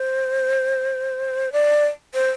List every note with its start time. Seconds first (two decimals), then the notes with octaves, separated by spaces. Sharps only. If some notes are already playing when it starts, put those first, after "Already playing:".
Already playing: C5
1.52 D5
2.14 C5